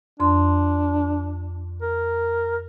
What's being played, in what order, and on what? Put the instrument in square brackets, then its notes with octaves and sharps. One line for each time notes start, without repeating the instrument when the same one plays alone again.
[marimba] F2 C6 [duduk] D4
[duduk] A#4